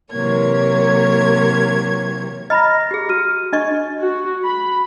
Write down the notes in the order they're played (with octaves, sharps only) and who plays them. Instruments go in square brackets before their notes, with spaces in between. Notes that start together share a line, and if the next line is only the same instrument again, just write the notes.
[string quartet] C3 E3 F#3 A#3 C#5 G#6
[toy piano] D#5 A#5 B5 [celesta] F6 A#6
[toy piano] G4 G#4
[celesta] F#4 F6 D#7
[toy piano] D4 D#5 C#6
[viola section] F#4
B5